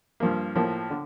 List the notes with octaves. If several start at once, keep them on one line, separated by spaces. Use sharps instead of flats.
G2 F3 A#3
A2 F3 A#3
D3